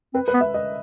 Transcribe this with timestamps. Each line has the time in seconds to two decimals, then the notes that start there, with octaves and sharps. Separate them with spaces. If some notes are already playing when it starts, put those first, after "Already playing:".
0.14 C4 B4
0.28 B4
0.34 B3
0.41 E5
0.54 D#5